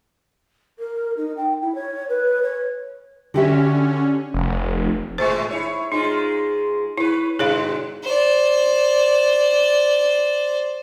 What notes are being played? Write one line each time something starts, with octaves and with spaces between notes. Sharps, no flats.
A#4
D#4
G5
E4
C#5
B4
C#5
D3 C#4 F#4 G4 E5
F1
A2 G#3 A3 C5
E4 C#5
G#2 G#3 D#4 F4
E4 B4 C#5
G2 B2 D3 G#4 C#5 F5
C5 D5